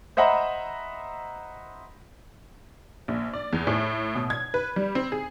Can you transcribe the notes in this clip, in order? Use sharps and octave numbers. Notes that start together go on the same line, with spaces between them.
C5 D#5 E5 F#5 A#5 B5
A#1
D5
E2
A2
B2
G#6
B4
G3
C4
G#4